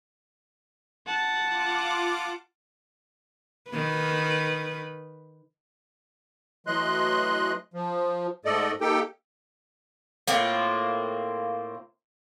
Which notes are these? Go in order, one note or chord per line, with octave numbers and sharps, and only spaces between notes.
F#5 A5
F4 D6
D#3 B4
E3 F#3 A3 D#5 C6 F#6
F3
G#2 A3 A4 D5 D#5
A#3 D#4 G4 A4 G5
A2 A#3 C4 F4